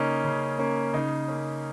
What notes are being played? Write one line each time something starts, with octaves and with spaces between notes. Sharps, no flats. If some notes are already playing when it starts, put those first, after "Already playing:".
Already playing: C#3 A#3 C#4 D#4
C#3
A#3 C#4
C#3 D#4
A#3 C#4